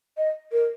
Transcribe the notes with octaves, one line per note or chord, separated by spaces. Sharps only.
D#5
A#4